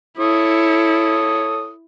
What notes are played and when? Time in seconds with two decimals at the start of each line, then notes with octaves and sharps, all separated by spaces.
0.19 E4 A4 C#5 D#6